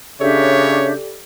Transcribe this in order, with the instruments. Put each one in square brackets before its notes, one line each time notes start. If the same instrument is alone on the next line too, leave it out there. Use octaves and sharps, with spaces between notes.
[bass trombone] C#3 [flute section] D4 E5 G6 [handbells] G4 A4 D5 [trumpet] C#5